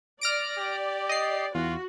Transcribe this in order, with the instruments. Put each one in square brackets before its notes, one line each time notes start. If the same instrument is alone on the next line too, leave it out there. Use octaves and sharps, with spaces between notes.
[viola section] D5 [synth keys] F6 A#6 D7
[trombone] G4
[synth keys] D#5 C7
[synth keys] E2 [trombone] F4 [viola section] F#4